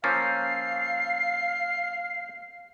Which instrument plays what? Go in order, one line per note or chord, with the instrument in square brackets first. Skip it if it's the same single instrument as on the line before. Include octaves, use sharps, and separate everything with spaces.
[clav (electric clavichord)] F3 A#3 C#4 [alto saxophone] F5 [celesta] E6 G6 A6 [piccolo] C7